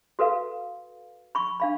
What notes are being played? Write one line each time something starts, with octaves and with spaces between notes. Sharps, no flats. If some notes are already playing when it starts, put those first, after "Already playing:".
F#4 A4 B4 F5
B5 C#6
D4 F5 B5